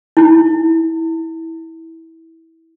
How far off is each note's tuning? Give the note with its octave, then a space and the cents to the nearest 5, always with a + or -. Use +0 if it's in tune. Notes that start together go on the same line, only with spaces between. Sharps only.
E4 -20